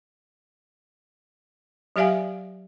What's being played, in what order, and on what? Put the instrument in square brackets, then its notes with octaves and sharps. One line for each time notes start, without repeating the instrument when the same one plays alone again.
[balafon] F#3 G4 D5 E5 F5 G#5